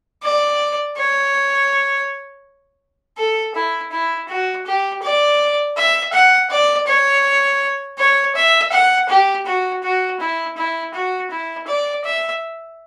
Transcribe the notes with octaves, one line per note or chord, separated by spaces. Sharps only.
D5
C#5
A4
E4
E4
F#4
G4
D5
E5
F#5
D5
C#5
C#5
E5
F#5
G4
F#4
F#4
E4
E4
F#4
E4
D5
E5